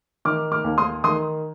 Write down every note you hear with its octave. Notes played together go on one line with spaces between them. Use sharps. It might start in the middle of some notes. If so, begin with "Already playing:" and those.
D#3 D6 F6
D6 F6
D#2
C6 D#6
D#3 C6 D#6